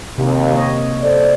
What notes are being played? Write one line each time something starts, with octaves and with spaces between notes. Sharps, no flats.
D#2 C3
A#3 C#5 D#5
A4 C5 D5